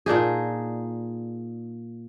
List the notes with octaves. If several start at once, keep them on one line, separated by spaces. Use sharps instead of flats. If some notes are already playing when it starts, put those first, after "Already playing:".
A#2 D4 D#4 G#4